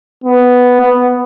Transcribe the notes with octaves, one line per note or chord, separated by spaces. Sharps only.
B3
B3